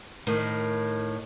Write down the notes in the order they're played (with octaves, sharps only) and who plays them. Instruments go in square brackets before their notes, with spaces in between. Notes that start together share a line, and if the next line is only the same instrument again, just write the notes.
[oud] A2 D#3